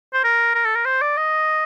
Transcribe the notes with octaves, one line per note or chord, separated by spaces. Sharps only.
C5
A#4
A#4
A4
A#4
C5
D5
D#5